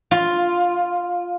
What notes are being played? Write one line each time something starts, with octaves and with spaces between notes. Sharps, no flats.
F4